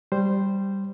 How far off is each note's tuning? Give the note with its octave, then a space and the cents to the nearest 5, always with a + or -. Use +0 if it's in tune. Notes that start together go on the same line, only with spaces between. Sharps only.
G3 +0 C5 +0